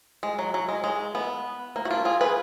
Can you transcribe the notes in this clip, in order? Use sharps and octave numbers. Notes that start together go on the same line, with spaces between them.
G#3
F#3
F#3
G#3
G#3
B3
A#3
F#4
D4 F4
F4 G#4
G#4 B4